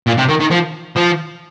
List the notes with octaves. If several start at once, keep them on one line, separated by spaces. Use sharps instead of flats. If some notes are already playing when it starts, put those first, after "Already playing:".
A#2
C3
D#3
D#3
F3
F3